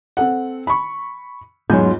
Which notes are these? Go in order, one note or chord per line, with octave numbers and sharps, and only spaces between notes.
C4 A4 F#5
B5 C#6
E2 G#2 F#3 F4 G#5 G6